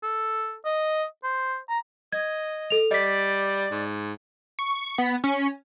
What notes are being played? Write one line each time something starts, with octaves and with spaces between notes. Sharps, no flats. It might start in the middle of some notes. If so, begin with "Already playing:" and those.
A4
D#5
C5
A#5
D#5 G#6
A4 F7
G3 D5 D#5 B6
G#2
C#6
B3
C#4